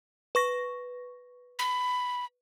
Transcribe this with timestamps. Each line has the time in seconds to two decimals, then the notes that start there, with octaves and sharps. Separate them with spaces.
0.35 B4 C#6 A#6
1.59 B5